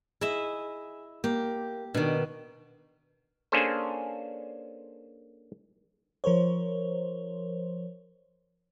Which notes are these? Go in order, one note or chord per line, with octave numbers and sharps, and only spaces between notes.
E4 G#4 D#5 E5
A#3 G4
B2 D#3 D4
A#3 C#4 D4 G#4 A4 C5
F3 A#4 C5 C#5